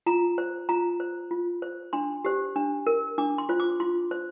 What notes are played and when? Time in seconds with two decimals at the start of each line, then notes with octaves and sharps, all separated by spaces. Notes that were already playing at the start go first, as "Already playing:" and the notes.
0.06 F4 A#5
0.38 C5
0.69 F4 A#5
1.00 C5
1.31 F4
1.62 C5
1.93 D4 C6
2.25 G4 C5
2.56 D4
2.87 A#4
3.18 D4 D6
3.38 C6
3.49 F4 C5
3.60 D6
3.80 F4 C6
4.11 C5